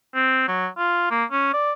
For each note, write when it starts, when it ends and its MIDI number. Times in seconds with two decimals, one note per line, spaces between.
0.15 0.45 60
0.48 0.68 54
0.78 1.07 65
1.11 1.25 58
1.32 1.49 61
1.54 1.73 74